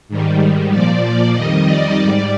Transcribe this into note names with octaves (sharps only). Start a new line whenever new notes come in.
G#2 D#3 G3
A#2 F3 D5
D5
F2 D#3 G3 D#5
D5
G#2 G3